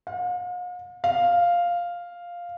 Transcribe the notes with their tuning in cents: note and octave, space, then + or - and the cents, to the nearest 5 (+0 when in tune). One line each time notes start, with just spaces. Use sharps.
F5 +45
F5 +0